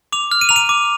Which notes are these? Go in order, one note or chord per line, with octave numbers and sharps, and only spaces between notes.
D6 F7
F6
D#7
A#5 F7
D#7
D6